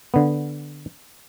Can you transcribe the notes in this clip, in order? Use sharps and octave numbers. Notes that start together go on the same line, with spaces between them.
D3 B3